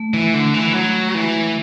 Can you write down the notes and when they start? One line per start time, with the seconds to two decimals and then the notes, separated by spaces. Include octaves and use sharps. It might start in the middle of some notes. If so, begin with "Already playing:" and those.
Already playing: A3
0.14 E3
0.34 D3 G#3
0.54 E3
0.74 F#3
1.15 E3